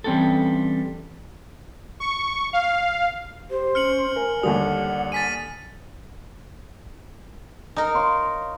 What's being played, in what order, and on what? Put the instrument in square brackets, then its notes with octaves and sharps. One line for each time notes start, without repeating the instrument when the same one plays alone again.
[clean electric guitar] E3 G3 C4 C#4 F#4 A4
[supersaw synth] C#6
F5
[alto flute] G4 [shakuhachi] C5
[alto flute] C#4 [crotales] F6 C#7 F#7
[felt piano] A#4 [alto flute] G#5
[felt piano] D#2 D3 G3 [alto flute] D5 [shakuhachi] F#5 [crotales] D#6
[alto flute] G#5 [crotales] A6 B6 D#7
[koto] D#4 A#4
[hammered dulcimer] C#5 F5 C6